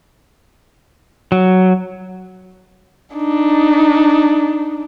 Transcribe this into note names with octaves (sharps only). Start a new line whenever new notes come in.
F#3
D4 D#4